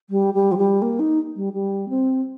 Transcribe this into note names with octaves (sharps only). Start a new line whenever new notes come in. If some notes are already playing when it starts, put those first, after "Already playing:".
G3
G3
F3
G3
A#3
D#4
G3
G3
C4